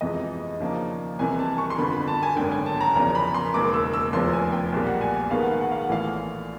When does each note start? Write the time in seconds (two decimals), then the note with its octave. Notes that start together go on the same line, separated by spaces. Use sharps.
0.01 F2 C3 E3 G#3 D#5
0.60 D#2 C#3 F3 A#3 D4
1.19 C2 C3 E3 G#5
1.39 A5
1.58 C#6
1.70 C6
1.78 G1 F2 D3 B5
1.93 B5
2.08 A5
2.23 G#5
2.36 G#1 F#2 D3 G5
2.52 G#5
2.66 A5
2.81 A#5
2.95 F#1 E2 C#3 F3 A#5
3.15 B5
3.34 C6
3.54 E1 D#2 C#3 D6
3.74 E6
3.93 E6
4.12 F1 E2 C#3 F3 C6
4.33 G#5
4.52 G5
4.72 B1 A#2 G3
4.87 F#5
5.01 G#5
5.16 G#5
5.31 D#2 D#3 G#3 B3 F5
5.41 F#5
5.51 F5
5.61 F#5
5.72 F5
5.81 F#5
5.89 A#1 A2 E3 F5